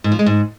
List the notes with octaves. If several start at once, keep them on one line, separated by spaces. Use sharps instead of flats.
G#2
F3
G#3
G#2